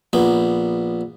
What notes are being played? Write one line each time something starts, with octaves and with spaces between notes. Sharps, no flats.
A#1 B3